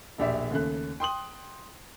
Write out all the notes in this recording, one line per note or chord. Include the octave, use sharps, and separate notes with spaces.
E1 A#1 D4 G4 D5 E5
D#2 C#3 A3 F#6
G5 C6 D#6 F#7